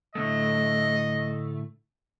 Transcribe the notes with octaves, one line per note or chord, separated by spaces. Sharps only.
A2 D3 A3 D#5